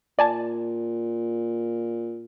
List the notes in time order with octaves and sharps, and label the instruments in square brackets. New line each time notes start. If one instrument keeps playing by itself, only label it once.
[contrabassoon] A#2 [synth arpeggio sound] D5 G#5 A5